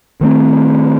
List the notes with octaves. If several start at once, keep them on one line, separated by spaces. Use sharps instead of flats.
D#3 A3 C4